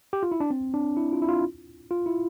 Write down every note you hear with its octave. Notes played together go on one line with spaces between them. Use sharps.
G4
F4
E4
D4
C4
D4
E4
F4
E4
F4
F4
E4